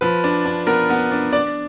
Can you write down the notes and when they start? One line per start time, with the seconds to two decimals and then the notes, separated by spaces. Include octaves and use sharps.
0.01 F3 B4
0.24 D4
0.45 D4
0.67 B3 A#4
0.90 B3
1.11 D4
1.33 D4 D5